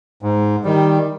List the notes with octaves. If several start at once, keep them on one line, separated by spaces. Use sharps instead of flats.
G#2
D#3 G3